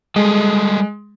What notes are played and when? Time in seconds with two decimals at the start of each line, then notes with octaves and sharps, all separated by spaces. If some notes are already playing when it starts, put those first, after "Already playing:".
0.16 G3 G#3 A4 D#5